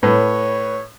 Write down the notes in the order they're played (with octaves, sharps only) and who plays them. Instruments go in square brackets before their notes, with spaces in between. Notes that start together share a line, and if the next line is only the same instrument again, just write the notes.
[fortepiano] A2 [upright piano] B4 [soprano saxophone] C#5